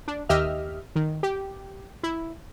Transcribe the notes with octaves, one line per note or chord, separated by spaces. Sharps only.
D4
D#2 G4 D#5 E5 F6
D#3
G4
E4